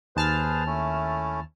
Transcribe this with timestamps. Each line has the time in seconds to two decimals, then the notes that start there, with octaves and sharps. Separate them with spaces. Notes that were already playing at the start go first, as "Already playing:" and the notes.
0.16 D#2 G#4 B4 C5 A5 F6
0.66 A3 C#4 E4